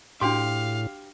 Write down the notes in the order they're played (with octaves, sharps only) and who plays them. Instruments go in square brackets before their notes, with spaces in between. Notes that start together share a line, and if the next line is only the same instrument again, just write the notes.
[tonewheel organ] A2 [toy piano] D4 F#4 C6 [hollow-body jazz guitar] G4 [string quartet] F5